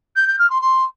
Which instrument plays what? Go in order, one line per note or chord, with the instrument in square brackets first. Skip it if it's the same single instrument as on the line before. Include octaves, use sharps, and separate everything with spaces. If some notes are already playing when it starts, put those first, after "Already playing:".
[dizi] G6
G6
F6
C6
C6